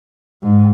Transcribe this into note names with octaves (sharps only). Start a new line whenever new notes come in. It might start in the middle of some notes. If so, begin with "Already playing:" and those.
G#2